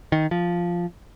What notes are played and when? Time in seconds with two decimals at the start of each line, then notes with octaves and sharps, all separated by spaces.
0.12 D#3
0.31 F3